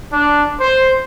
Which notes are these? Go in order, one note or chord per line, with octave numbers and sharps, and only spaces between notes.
D4
C5